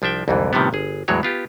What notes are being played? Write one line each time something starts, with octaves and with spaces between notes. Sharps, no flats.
C2 F3 D4 E5 G5
C2 F2 G#2 D3 E3
A2 C3 D#3 F3 G3 B3
G1 G#4
E2 A2 E3 F#3 G#3 C#5
B3 F4 G4